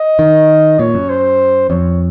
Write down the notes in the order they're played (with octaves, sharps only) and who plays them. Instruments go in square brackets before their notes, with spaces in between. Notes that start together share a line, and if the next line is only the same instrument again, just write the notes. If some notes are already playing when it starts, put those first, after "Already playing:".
Already playing: [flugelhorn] D#5
[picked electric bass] D#3
[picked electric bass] A#2 [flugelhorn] C#5
[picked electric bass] F#2
[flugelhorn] C5
[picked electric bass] F2 [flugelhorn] C#5